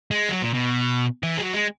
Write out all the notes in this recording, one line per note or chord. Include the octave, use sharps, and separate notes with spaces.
G#3
F#3
A#2
B2
E3
G#3
F#3
G#3